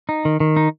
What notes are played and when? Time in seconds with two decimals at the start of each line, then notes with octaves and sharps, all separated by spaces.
0.09 D#4
0.25 D#3
0.40 D#3
0.57 D#4